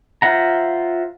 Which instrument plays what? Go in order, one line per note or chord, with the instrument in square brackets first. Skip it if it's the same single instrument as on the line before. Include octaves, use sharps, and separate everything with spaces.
[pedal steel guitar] F4 C5 E5 F#5 A#5